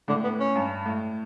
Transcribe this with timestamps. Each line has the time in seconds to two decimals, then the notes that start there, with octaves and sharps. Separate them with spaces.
0.08 A2 D3
0.24 B3
0.40 C#4
0.56 G2
0.86 A2